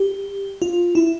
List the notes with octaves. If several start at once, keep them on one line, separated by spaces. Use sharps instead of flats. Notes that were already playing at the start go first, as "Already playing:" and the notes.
Already playing: G4
F4
E4